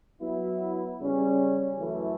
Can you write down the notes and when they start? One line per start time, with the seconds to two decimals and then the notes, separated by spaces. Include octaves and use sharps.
0.21 F#3 B3 E4
1.00 C#3 G3 C#4
1.78 F#2 E3 A3 E4